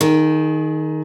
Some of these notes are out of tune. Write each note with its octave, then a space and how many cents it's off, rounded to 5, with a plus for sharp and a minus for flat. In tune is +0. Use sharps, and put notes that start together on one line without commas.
D#3 +0 G#4 +30